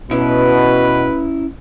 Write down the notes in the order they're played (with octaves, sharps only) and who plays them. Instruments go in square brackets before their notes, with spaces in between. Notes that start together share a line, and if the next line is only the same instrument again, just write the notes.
[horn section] B2 [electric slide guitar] C#4 E4 [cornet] B4